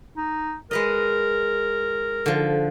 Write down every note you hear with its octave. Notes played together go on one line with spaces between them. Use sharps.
D#4
G#3 A#4 B4 D#5
D3 F3